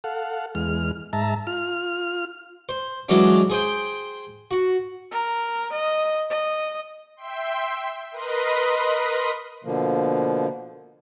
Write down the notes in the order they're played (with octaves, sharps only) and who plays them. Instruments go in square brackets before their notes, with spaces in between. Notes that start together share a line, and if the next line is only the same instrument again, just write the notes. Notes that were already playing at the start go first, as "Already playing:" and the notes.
[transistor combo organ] A4 F5 F#5
E2 G#3 F6
G#2 E5 A5 A#5
F4 F6
[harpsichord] C5
E3 F#3 G#3 C#4 D4
G#4 C5 G5
F#4
[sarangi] A#4
D#5
D#5
[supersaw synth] E5 G5 C6
A#4 B4 D#5 B5 C6 D#6
[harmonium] B2 D3 F3 A#3